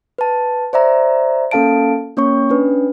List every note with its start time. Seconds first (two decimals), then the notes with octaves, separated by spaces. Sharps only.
0.18 B4 A5
0.73 C5 D5 E5 A#5
1.51 A#3 C#4 A4 F5 A5 D7
2.17 A#3 C#4 C#5 C#6
2.50 C#4 D4 B4